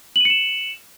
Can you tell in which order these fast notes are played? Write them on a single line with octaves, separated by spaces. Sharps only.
F#7 D#7 C#7 E7